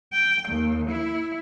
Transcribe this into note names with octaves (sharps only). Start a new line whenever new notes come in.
G5
D#2
E4